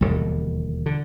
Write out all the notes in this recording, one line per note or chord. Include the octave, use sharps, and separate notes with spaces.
E1 D#2 D3 G3
D3